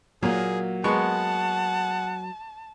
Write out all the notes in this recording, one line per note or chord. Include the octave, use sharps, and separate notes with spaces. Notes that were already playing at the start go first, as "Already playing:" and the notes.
A#2 F#3 A#3 G#4
G#3 B3 F#5 A5 C#6